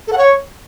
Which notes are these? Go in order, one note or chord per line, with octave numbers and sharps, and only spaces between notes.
A4
F#5
C#5